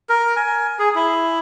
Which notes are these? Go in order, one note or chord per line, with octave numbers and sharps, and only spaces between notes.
A#4
G#5
G#4
E4